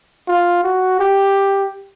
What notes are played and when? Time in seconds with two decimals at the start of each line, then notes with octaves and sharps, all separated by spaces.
0.28 F4
0.64 F#4
0.99 G4